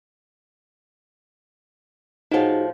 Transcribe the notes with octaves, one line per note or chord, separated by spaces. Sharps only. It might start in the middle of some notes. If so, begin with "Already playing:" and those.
A2 F3 D#4 F#4 G#4